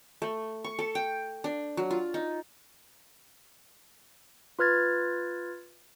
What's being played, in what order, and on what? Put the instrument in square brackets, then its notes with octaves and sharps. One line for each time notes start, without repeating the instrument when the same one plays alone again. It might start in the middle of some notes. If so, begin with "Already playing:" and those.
[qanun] A3
C#6
A4
G5
D4
F#3
F4
D#4
[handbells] F4 B4 F6 G#6 A6